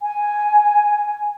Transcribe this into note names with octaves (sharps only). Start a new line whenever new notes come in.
G#5